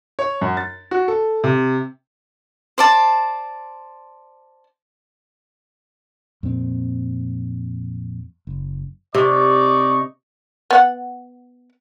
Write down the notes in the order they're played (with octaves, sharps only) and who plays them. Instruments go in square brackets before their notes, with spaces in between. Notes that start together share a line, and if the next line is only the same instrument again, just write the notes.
[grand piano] C#5
F#2
A6
F#4
A4
C3
[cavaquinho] C5 D5 A5
[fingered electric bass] F2 A#2 C4
F#1
[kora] C3 [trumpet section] D#4 D5 C#6
[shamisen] B3 D5 F#5